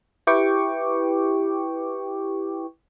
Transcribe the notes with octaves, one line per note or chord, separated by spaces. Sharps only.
E4 G4 B4 G5 C#6 D6